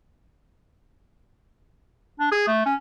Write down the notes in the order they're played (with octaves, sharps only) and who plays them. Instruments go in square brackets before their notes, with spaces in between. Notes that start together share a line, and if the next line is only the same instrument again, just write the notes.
[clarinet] D4
G#4
A3
C#4